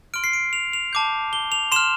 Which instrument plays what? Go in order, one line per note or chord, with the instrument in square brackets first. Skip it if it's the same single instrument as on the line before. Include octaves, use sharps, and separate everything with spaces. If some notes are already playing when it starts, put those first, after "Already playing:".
[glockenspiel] C6 F6 D7
C7
D7
F7
F7
A5 D6 G6
G7
F7
C6 F6 E7